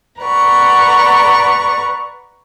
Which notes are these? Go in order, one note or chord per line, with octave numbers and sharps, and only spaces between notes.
B4 D5 F#5 A#5 C#6